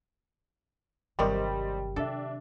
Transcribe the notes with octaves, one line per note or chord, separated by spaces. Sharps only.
G1 C3 D#3 F#3 G3 G4 C5 D#5
C3 D4 A4 E5